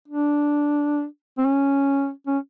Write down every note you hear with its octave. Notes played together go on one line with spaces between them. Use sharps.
D4
C4
C#4
C#4